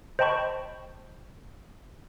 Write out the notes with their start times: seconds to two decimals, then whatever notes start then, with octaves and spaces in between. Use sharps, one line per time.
0.19 C5 D#5 G5 A5 B5 C#6